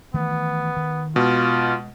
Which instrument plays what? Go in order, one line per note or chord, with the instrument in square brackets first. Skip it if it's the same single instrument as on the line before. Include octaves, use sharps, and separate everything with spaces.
[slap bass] D#3 E3 A3 [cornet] B3
[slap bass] D#3
[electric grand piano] B2 [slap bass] G#3 [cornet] F4